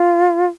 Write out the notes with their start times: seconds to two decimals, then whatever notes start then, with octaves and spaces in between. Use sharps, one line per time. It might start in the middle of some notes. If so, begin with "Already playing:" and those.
Already playing: F4